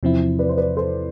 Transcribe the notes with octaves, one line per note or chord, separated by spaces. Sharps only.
E2 C3 F3 C4 E4
B4 D5
C5
B4 D5
A4 C5